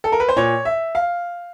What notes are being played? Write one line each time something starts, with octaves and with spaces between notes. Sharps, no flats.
A4
A#4
B4
C5
A#2 C#5
E5
F5